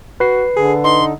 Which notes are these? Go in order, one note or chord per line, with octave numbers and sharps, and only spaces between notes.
F#4 B4 C7
D3 G#4
D#4 C6